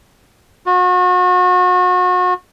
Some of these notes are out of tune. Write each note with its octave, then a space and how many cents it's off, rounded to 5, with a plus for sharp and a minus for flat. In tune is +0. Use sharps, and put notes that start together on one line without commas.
F#4 -35